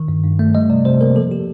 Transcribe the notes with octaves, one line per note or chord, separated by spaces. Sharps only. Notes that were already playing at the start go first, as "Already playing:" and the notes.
Already playing: D#3
G2
G2
A3
G3 D#5
C3 D5
C3 C5
A#3 A#4
F3 A4
G4